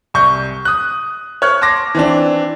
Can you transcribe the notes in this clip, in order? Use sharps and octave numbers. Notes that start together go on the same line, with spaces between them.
C2 C#6 G6
D#6 F#6
C#5 F6 F#6
A5 C6 D6 A#6
E3 C4 D4